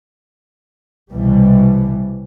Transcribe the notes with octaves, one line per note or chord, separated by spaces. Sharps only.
C2 B2 E3 G3